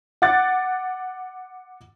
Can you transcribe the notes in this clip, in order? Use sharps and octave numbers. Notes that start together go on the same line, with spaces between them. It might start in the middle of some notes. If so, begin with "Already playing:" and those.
F#5 D6 F#6 A6